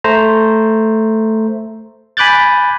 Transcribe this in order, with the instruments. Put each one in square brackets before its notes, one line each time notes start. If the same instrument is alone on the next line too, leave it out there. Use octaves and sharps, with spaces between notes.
[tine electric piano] A3 C5 A#5
G#5 B5 D6 F#6 G6 A6